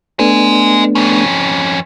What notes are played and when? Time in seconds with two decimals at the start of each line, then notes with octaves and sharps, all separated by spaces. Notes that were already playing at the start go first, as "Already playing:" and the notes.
0.19 A3 B3 D4 D#5 G#5
0.95 F2 C#4